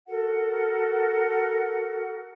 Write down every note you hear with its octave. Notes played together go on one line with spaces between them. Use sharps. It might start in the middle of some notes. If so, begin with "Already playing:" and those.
F#4 A4 A#4 F#5